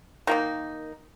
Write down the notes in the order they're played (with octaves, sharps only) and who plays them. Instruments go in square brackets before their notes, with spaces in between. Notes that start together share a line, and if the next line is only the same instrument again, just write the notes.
[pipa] D#3 A#3 D#4